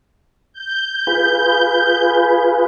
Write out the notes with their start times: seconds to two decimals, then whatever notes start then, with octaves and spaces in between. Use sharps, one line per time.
0.53 G6
1.07 F4 G#4 B4